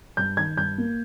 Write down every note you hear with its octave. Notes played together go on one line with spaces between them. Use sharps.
G2 G6
D#3 G#6
G2 G6
A#3